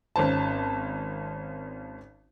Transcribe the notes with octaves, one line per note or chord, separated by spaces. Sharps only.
G#1 C#4 C5 A5